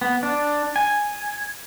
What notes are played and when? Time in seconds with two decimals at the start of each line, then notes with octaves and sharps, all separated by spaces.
0.01 B3
0.23 D4
0.76 G#5